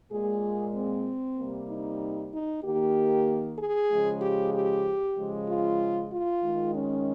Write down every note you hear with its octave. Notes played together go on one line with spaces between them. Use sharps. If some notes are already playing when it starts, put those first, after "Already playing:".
A#2 G#3 G#4
C4
C3 G3 A#3
D#4
D#4
D#3 A#3 G4
G#4
C#3 F3 G#3
G4
G4
C#3 F3 G#3
F4
F4
D#3 G#3
C#4